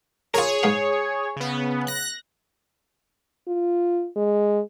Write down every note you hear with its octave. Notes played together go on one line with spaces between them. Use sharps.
F4 G#4 A#4 C#5
G#2 B4 F5
C#3 B3
F#6 A#6
F4
G#3